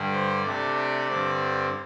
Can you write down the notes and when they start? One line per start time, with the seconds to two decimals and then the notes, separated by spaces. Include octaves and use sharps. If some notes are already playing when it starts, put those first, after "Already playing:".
Already playing: G2 D3 G3
0.12 C5
0.43 C3 A3 D4 D5
0.76 D5
1.08 G2 D3 C4 D5